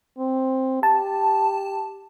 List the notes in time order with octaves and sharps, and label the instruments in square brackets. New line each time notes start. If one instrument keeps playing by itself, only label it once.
[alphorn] C4
[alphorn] G4 [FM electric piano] A5